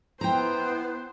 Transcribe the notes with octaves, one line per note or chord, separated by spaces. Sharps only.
B3 E4 C5 G5 A#5